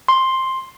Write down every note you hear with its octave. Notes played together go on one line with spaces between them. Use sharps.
C6